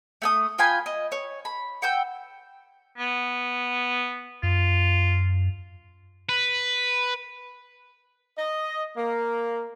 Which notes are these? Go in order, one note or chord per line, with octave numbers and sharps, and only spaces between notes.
A3 G5 D#6
F4 G5 G#5 B5
D#5
C#5
B5
F#5 G5 E6 G6
B3
F#2 F4
B4
D#5
A#3